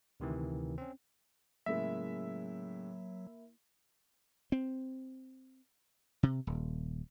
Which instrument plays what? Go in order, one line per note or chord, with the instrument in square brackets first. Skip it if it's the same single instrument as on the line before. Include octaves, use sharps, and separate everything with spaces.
[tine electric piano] D2 C3 D#3 E3
C4 C#4
[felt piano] A2 C#3 G#3 [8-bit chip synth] F#3 [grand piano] A#3 E4 B6 [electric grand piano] E5
[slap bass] C4
C3
D#1